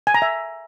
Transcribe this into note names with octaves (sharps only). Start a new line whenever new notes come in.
G#5
A#5
E5